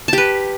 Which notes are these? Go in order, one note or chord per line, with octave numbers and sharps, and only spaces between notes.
G4 B4 A5